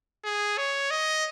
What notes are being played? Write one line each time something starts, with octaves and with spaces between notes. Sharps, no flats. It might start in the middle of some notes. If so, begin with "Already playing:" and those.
G#4
C#5
D#5